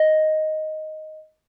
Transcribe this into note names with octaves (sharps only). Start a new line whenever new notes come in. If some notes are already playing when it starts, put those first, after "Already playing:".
Already playing: D#5